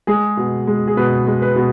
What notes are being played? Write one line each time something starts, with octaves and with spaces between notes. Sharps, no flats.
G#3 G#4
B2
G#3
G#4
B2 B4
G#3
B4
B2